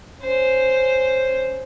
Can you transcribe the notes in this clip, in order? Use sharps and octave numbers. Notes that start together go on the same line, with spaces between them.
C#4 C5